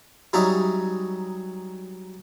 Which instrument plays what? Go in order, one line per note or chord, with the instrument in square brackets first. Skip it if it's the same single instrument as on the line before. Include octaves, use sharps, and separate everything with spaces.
[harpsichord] F#3 G3 C#4 D#4 E5